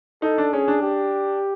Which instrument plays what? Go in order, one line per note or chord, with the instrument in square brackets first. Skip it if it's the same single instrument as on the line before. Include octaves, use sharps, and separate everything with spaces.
[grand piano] D#4 [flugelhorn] A4
[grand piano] D4
[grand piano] C#4 [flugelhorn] G#4
[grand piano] D4
[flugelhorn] G4